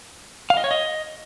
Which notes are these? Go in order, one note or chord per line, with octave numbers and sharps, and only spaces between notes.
F5
D#5
C#5
D#5